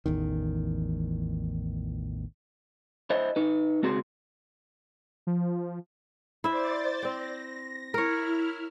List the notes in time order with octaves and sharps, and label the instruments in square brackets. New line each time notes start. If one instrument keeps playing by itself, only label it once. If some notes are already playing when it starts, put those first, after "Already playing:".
[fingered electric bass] A1 E2 D#3
[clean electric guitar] E4 C5 D#5
D#4 B4
C#2 C4 F#4 G#4 C6
[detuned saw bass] F3
[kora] E4 E5 [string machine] C5 D5 A6
[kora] C4 G5 [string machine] A#6
[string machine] E4 F6 [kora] A#4 C#5